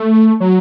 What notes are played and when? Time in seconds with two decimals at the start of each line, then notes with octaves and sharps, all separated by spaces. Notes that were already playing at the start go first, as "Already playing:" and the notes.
Already playing: A3
0.40 F#3